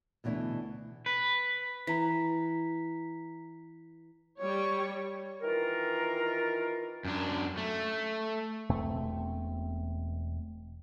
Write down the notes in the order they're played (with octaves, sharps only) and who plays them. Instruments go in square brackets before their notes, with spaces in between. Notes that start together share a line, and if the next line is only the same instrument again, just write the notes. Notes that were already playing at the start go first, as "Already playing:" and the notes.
[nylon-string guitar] D2 B2 E3 D4 E4
[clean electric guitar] B4
[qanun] E3 [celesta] A#5 B6
[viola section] G3 C#5
[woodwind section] D#3 E3 F4 A#4
[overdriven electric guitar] F#2 D4
A3
[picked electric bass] E1 B2 A3 C4